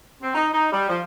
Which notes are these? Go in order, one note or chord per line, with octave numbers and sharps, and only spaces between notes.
C4
D#4
D#4
G3
F3